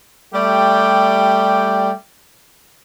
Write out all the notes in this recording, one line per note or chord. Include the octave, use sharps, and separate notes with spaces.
G3 A3 G4 D5 G5